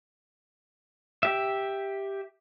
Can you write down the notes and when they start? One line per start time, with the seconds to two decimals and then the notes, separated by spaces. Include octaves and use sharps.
1.23 G4 E5